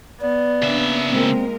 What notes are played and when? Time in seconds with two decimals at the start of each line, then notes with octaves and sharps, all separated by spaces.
0.21 B3 D5
0.62 C#3 A#3 D4 E5
1.10 A#2 G#3 C4 A#4